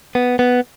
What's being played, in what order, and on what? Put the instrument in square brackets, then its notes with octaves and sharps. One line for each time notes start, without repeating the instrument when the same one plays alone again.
[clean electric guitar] B3
B3